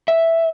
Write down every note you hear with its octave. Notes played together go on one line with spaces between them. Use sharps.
E5